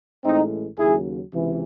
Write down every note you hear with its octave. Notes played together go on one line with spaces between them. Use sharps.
A1 A2 G#3 C4 D#4
D#2 C#3 F#3 E4 G#4
C#2 C3 E3